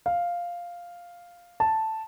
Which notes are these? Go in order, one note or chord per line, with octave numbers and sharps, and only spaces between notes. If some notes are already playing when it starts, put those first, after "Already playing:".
F5
A5